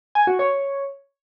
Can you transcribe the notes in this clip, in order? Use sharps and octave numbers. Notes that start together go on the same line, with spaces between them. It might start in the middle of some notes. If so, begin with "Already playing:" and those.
G#5
F#4
C#5